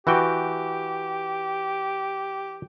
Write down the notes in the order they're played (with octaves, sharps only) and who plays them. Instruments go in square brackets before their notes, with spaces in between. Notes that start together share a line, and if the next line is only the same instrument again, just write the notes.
[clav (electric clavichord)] E3 F#4 G5 [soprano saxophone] G4